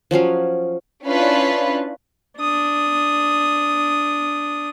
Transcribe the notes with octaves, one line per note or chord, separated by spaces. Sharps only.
F3 F#3 C#4 F5
C#4 D4 E4 F4 B4
D4 D#6